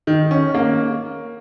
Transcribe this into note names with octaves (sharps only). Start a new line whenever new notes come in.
D#3
C#4
A#3